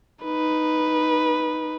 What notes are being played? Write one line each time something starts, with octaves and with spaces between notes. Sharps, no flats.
D#4 B4